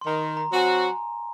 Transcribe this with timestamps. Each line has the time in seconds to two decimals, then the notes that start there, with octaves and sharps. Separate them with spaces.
0.01 C6
0.06 D#3 A#5
0.37 A#5
0.52 F#3 C4 F#4 G#5
0.67 A#5